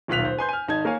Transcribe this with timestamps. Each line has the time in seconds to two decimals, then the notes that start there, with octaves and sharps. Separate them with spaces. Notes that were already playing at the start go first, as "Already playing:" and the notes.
0.08 D#1 B1 F4 F#6 B6 F7
0.25 C5
0.37 B4 G#5 C6 G6
0.49 G#5 F6
0.68 G#1 D#4 A5 G#6
0.85 A#3 A#4 C#5 F5 G#5